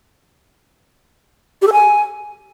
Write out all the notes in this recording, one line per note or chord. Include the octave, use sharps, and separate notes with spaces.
G4
A4
G#5